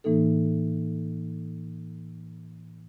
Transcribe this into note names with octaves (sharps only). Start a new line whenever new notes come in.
A2 E3 A#3 D#4 A4